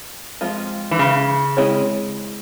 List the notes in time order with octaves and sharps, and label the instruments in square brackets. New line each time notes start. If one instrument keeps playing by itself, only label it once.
[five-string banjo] F3 G#3 C4 F4
[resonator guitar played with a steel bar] E3
C#3
[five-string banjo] G#3 C4 E4 G#4 C#5